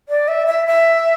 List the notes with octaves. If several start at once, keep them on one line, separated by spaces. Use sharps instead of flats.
D5
E5
E5
E5